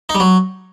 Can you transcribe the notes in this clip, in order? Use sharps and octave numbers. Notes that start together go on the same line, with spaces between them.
D#4
G3
F#3